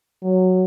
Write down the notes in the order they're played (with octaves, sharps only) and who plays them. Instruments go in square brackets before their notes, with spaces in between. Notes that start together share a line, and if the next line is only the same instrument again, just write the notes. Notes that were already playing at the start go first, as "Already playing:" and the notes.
[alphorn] F#3